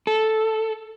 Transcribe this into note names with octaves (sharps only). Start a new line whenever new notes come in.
A4